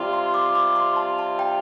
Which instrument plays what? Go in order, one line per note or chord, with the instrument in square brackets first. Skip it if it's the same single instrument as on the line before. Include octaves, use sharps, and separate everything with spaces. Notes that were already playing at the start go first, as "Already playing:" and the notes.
Already playing: [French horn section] C3 G3 F4
[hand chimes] C6
D6
D6
C6
A5
A5
G5